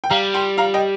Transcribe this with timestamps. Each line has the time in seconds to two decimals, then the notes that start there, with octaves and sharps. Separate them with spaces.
0.04 G5
0.10 G3 F5 A#5
0.34 G5 C6
0.58 F5 A#5
0.74 D#5 G5